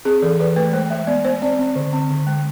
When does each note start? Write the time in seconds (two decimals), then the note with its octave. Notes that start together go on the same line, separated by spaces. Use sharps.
0.05 C4 G#4
0.22 E3 A4
0.40 E3 B4
0.56 A3 B4
0.73 G#3 C5
0.90 G#3 E5
1.07 B3 D5
1.25 B3 C5
1.42 C4 D5
1.59 C4
1.76 D3
1.93 C4
2.10 D3
2.27 G#3